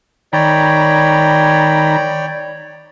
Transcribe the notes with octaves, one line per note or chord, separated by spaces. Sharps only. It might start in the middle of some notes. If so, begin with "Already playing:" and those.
D#3 C#5 D5 G5 A#5 B5